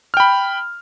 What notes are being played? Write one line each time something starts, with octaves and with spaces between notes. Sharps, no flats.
G5 B5 F6